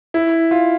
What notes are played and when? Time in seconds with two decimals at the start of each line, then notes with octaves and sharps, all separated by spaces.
0.14 E4
0.51 F4